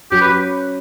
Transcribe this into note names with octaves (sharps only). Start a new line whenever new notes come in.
F#3 C#4 F#4 G4
B4